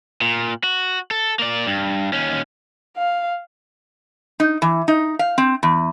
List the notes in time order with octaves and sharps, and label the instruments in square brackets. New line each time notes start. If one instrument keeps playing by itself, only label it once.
[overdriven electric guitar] A#2
F#4
A4
A#3 D5
G2
D#2 C#4
[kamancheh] F5
[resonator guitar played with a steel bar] D#4
E3
D#4
F5
C4
E2